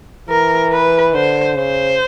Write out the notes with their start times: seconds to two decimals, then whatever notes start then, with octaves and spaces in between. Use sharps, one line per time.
0.29 E3 A#4
0.72 B4
1.14 D3 C5
1.56 C#3 C5